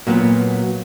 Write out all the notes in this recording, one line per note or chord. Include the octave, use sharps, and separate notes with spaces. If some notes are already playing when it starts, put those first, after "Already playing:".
A#2 F#3 B3